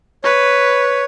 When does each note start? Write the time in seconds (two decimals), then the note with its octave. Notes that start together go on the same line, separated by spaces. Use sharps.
0.24 B4 C#5